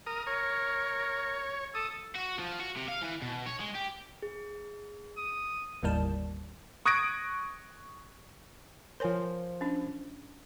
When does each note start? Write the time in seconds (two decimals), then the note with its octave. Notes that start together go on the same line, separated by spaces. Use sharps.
0.07 A#4 D#6
0.27 A#4 C#5
1.75 A4 D#6
2.16 F#4
2.39 F3
2.60 F#4
2.77 C3
2.89 F5
3.02 E3
3.22 B2
3.46 C#5
3.60 G#3
3.75 G4
4.22 G#4
5.17 D#6
5.83 G1 D#2 A2 D#3 G3 A5
6.85 C#6 D#6 F#6 G#6 A#6 D7
9.00 F3 A#4 C5 C#5 G#5
9.61 C#4 D4